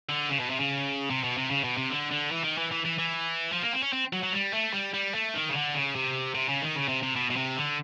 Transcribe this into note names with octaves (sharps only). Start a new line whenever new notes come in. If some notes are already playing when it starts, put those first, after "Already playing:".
D3
C#3
B2
C3
C#3
C3
B2
C3
C#3
B2
C3
D3
D3
E3
D#3
E3
E3
E3
E3
F3
A#3
C4
C#4
C4
F#3
F#3
G3
A3
G3
G3
A3
D#3
C#3
D3
C#3
C3
C3
C#3
D#3
C#3
C3
C3
B2
B2
C3
D3